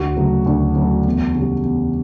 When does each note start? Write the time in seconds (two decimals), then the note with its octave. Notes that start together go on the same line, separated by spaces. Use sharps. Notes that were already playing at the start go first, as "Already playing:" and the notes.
Already playing: D2 F#4
0.17 C#3 F#3 A3
0.46 D2
0.76 C#3 F#3 A3
1.06 E2
1.35 C#3
1.40 G3
1.64 E2